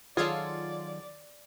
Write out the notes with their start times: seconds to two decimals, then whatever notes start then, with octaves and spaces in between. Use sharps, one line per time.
0.17 D#3 F#3 F4 G#4 A4 C#5 D5